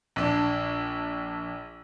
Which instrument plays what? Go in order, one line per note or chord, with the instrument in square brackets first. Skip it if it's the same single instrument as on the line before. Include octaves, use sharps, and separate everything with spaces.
[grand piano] A#1 D4